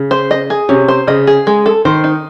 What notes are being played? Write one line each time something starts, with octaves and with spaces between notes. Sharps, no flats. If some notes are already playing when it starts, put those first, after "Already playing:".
Already playing: C#3
C5
D#5
G#4
C3 C#4
C5
C#3 D#5
G#4
G#3
A4
D#3 C5
D#4